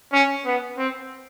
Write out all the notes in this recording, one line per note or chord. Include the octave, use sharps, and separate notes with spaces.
C#4
B3
C4